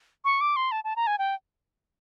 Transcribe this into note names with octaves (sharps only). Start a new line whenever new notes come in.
C#6
D6
C6
A5
A5
A#5
G#5
G5